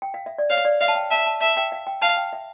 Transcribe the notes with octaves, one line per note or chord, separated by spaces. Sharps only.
G5
F5
E5
D5
C#5 F5
D5
E5 F5
A5
G5
E5 A5
A5
E5 A5
G5
F5
G5
F5 A5
G5
E5